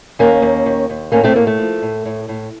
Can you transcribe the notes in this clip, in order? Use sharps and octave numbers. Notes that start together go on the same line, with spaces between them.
D#2 A#3 C#4
D#2
D#2
D#2
A2 A#3 C#4
A3 C4
A2 A#3
A3
F3
A2
A2
A2